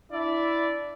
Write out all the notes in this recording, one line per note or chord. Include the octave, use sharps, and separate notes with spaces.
D4 E4 D5 E5